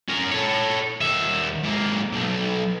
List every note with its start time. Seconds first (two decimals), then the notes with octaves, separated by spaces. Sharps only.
0.09 C#4 A#4
0.32 A4 C#5
1.01 D#2 E5
1.64 G#2 A#3
2.13 B1